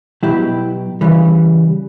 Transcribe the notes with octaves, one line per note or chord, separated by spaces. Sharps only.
B2 F#3 E4 G4
C#3 E3 G3